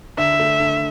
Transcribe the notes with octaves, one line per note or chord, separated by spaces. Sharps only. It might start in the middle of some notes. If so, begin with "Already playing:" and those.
D3 E5
A3
D3